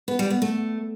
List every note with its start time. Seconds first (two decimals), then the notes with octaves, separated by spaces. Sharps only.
0.08 B3
0.19 G3
0.30 B3
0.42 A3